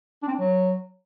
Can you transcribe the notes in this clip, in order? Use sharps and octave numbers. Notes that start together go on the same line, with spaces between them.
D4
C4
D4
F#3